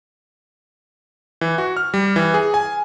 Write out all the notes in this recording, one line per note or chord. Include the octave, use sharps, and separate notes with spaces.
E3
F#4
F6
G3
E3
G#4
G#5